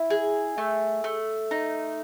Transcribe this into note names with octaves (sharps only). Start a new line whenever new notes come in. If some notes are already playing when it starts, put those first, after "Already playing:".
Already playing: E4
G#4
A3
A3
D#4